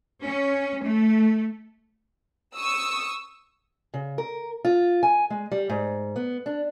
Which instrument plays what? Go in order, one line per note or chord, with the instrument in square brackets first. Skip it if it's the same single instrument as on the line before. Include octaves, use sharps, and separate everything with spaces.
[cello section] C#4
A3
[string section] C#6 D#6 E6
[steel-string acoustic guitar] C#3
A#4
F4
G#5
G#3
G3
G#2
B3
D4